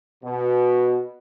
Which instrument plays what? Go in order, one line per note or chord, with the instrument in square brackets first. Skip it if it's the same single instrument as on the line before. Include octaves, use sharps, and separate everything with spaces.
[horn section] B2